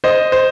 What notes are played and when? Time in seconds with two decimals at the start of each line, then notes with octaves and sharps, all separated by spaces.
0.04 C5 D#5
0.32 C5